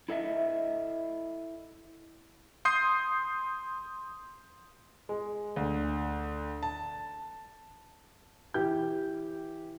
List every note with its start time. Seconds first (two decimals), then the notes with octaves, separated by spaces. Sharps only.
0.09 E4 A4 D#5 E5
2.65 C6 D#6 G6 C7
5.09 G#3
5.56 D2
6.63 A5
8.54 E3 G4 G6